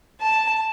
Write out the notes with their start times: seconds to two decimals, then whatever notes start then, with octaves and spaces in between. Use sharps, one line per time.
0.21 A5